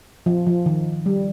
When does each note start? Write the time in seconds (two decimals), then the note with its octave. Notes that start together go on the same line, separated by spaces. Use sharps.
0.26 F3
0.46 F3
0.66 D#3
1.06 G3